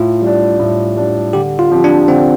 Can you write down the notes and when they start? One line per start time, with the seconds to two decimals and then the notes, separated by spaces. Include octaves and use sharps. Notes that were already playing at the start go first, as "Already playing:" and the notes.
Already playing: A2 F4
0.22 G3 D4
0.59 A2
0.97 G3 D4
1.33 D3 G4
1.59 F4
1.71 F3 C4 G4
1.84 D4
2.08 D3 C4